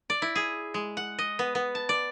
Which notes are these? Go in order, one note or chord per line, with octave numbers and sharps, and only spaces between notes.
D5
E4
G#4
G#3
F#5
D#5
B3
B3
A5
D5